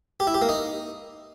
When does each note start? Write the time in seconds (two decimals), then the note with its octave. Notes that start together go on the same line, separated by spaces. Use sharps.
0.20 G4
0.27 E4
0.34 G4
0.42 A#3
0.49 D#4